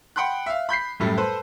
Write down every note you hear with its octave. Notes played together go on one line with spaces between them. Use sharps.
F#5 G5 B5 C6 F#6
E5 F5
B5 G6 B6 C7
F#2 A2 G3 A3
A4 B4 C5 A5